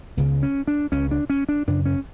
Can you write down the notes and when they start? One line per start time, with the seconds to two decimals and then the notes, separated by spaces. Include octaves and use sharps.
0.17 C#2 C#3 B3
0.43 C#4
0.68 D4
0.92 C#2 C#3 C#4
1.11 D4
1.30 C#4
1.49 D4
1.67 F#2 C#3 D4
1.85 C#4